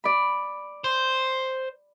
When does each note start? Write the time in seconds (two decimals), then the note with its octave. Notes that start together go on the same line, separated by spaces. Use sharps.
0.04 D5 B5
0.84 C5